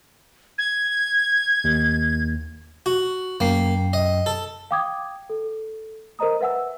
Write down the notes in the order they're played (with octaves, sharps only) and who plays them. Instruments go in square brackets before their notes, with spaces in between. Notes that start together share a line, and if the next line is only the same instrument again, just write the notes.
[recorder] G#6
[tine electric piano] D#2
[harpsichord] F#4
[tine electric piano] F#2 G5 C7 [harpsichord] A#3
[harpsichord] D#5
A4
[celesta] F5 G5 D6 D#6 G#6
A4
A#4 C5 D#5 A#5 D#6
B4 E5 F#5 G#5 E6